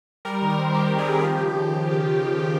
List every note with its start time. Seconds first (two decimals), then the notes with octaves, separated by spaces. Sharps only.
0.25 G3 A#4
0.42 D#3
0.50 A#4
0.58 C4
0.74 D#3 G4
0.90 G3
0.98 G#4
1.06 D#3
1.22 F3 G4
1.39 C#3